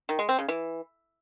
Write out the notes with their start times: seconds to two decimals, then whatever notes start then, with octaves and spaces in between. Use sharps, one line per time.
0.09 D#3
0.19 G#3
0.29 C4
0.39 C#3
0.48 E3